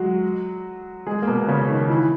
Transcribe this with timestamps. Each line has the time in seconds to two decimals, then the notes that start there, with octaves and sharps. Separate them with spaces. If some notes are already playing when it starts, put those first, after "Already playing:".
Already playing: F#3 G#3 F#4
1.07 G#3 G#4
1.22 A#3
1.27 B2 B3
1.48 C#3 C#4
1.69 D#3 D#4
1.90 E3 E4